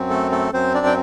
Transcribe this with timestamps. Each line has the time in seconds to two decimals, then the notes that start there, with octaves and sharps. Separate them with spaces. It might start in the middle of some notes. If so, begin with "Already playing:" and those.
Already playing: F#2 F#3 C4
0.10 A3 A4
0.31 A3 A4
0.53 F#2 F#3 C4 C5
0.74 D4 D5
0.86 G5